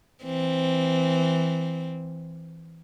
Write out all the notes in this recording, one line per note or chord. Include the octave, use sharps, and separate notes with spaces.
E3 C4